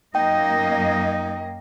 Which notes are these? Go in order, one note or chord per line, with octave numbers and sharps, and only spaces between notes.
F#2 A#3 D#4 D#5 G5